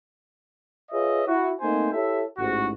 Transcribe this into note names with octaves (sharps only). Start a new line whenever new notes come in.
F4 G#4 B4 C#5 D#5 E5
E4 F#4
A3 A#3 C4 D#4 C5 G#5
E4 G4 A4 C#5 E5
A1 G#2 F#4